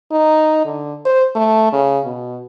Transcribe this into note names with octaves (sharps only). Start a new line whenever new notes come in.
D#4
D3
C5
A3
C#3
B2